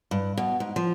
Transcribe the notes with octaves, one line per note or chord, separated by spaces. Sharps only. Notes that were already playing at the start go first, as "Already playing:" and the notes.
G2
B2
G#2
F3